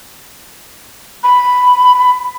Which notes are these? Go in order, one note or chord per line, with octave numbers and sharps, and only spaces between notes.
B5